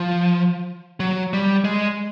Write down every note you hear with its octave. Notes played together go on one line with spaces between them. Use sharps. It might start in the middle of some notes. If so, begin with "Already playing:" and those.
Already playing: F3
F#3
G3
G#3